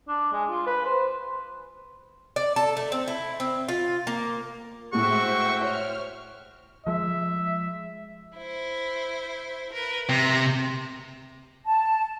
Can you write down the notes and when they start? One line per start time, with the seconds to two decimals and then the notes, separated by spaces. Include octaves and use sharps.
0.08 D4
0.33 G#3
0.50 F4
0.67 B4
0.86 C5
2.36 D5
2.56 A4
2.77 A3
2.92 C4
3.08 E4
3.40 C4
3.68 F4
4.07 A#3
4.93 A2 G#3 F#4 C5 E5 G5 C#6
5.62 C#5 F6
6.87 F3 G#3 E5
8.37 E4 C5
9.72 A#4 B4
10.09 C3 A#5 A#6
11.66 A5